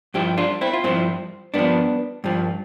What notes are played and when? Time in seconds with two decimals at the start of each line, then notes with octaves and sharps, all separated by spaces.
0.14 G2 F3 E4 G4
0.37 D4 F4
0.61 C4 E4
0.73 F4
0.84 G2 F3 C4 E4
1.54 G2 F3 B3 D4
2.24 G2 F3